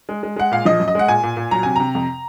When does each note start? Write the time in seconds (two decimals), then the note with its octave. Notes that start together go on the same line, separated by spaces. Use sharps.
0.09 G#3
0.23 G#3
0.36 G#3 F#5
0.52 A#2 F5
0.65 F3 D#5
0.79 F#2
0.88 D#5
0.95 G#3 F#5
1.08 A#2 G#5
1.23 A#2
1.37 A#2
1.51 F#3 A#5
1.63 C3 G#5
1.76 C3 A#5
1.95 F2